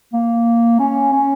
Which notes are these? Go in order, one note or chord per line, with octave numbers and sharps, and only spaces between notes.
A#3
C#4
C#4